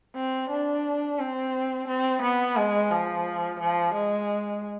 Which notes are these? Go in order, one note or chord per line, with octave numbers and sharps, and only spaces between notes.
C4
D4
C4
C4
B3
G#3
F3
F3
G#3